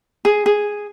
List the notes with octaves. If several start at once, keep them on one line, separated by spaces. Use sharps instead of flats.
G#4
G#4